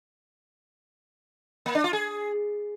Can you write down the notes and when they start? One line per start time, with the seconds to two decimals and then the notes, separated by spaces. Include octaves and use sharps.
1.66 A#3
1.75 D4
1.84 F4
1.93 G#4